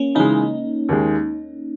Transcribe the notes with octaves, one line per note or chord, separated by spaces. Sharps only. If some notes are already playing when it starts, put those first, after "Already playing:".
Already playing: A#3 C#4
C#3 E3 G#3 D#4
D#2 D#3 G#3